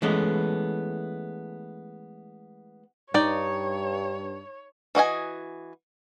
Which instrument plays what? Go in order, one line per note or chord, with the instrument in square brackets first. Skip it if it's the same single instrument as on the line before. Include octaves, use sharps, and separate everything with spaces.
[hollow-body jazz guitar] E3 G#3 A3 B3 C#4
[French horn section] G2 [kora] D#4 [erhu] C#5 [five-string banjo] D5 G5
[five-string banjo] E3 F#4 D#5 G#5